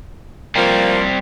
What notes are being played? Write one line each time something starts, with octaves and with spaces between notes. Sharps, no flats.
F3 G3 A#3 C4